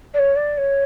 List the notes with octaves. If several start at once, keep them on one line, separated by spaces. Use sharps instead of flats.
D5
C#5
D5
C#5